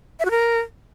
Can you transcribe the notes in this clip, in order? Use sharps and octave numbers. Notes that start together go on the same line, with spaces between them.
E5
F#4
A#4